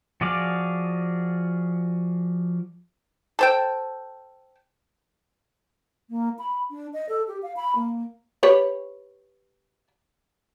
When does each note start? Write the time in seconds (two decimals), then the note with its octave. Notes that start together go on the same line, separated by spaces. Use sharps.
0.21 F3 F#4 G#4 D5 F5
3.39 A4 C5 G5
6.10 A#3
6.39 B5
6.70 D4
6.93 D#5
7.09 A4
7.28 G4
7.43 F5
7.56 B5
7.75 A#3
8.43 G4 B4 C#5